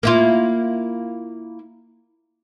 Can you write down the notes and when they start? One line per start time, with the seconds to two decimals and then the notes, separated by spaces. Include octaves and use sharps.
0.03 A#3 E4 F4